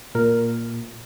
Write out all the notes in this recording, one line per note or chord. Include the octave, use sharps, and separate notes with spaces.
A#2 A#4